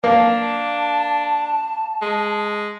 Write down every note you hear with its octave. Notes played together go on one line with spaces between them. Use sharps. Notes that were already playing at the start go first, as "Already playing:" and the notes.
A#3 D4 A5
G#3